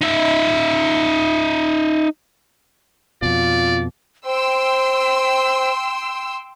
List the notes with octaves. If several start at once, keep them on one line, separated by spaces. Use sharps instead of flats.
D#4 E5
F2 B2 F4 D5
C5 G5 C6 E6